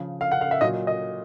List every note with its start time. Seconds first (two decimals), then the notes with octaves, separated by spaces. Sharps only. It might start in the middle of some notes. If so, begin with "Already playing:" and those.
Already playing: C#3 F3
0.21 F5
0.32 F#5
0.41 F5
0.51 E5
0.61 A#2 F#3 D#5
0.87 D#5